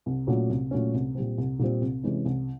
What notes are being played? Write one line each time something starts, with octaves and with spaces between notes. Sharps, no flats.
C2
A#2 F#3 A3 C#4
C2
A#2 F#3 A3 C#4
C2
A#2 G3 C4
C2
A#2 G3 C4
C2
C3 E3 G#3 C#4
C2